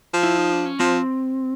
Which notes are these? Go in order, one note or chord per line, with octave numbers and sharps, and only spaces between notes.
F3
E4
D#4
D4
C#4
F3 C4